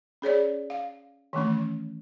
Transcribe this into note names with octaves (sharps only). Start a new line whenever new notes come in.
C#4 G#4 C#5 D5
F5
D#3 E3 A3 C#4